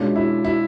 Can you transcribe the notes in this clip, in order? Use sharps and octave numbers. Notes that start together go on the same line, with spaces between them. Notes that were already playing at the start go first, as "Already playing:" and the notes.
Already playing: B2 G#3 C#4 D4 F4
E4
E4